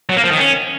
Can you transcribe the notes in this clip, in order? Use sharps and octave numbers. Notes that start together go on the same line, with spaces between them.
F#3
A#3
F3
D#3
C#4